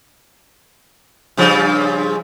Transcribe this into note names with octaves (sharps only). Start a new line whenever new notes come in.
G2 C#3 F3